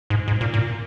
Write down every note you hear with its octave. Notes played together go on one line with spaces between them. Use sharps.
G#2
G#2
A#2
A#2